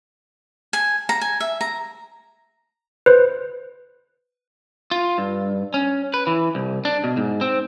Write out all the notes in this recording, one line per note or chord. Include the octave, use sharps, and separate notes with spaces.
G#5
A#5
G#5
E5
A#5
B4 C5
F4
G2
C#4
B4
E3
C2
D4
B2
G#2
C4